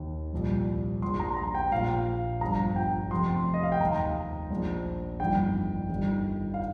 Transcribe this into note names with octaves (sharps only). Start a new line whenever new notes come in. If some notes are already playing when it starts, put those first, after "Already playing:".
Already playing: D#2 D#3
C2 A#2 F3
A#1 A#2 F3 C6
A#5
A#5
G5
A#1 A#2 F3 F5
G1 G2 F3 A#5
G5
F1 F2 C3 C6
D#5
F5
G5
D#2 D#3 A#5
A#1 A#2 F3
G1 F2 D#3 G5
G1 G2 D#3
F5